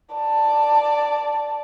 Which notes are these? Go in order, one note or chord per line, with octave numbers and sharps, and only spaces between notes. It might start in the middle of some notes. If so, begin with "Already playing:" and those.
D5 A5